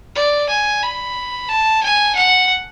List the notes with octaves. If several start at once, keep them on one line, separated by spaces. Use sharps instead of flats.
D5
G#5
B5
A5
G#5
F#5